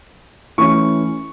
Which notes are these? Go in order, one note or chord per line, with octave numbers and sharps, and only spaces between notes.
E3 A3 C#4 C#6